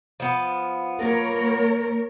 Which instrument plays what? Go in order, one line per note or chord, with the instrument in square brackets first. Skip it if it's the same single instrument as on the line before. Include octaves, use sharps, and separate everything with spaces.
[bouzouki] F3 B3
[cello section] A#3 A#4 C#5